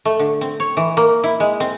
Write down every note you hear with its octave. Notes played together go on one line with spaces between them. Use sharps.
A3
D3
C4
C#5
E3
A#3
E4
G#3
C4